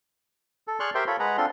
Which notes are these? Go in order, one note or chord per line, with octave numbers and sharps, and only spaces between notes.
A4
G#4 D5 C6 C#6 F6 F#6
G4 A#4 C5 E5 G5 C6
F4 A4 C#5 B5
G#3 G#4 B4 F#5 A#5
C4 D4 F4 A4 C6